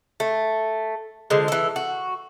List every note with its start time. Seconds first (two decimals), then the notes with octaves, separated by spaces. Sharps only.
0.20 A3
1.30 D3 F3 G#3
1.48 E3 A4
1.76 F#4